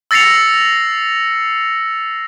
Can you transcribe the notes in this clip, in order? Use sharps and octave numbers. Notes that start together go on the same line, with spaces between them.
E6 A6 A#6 C7 C#7 F7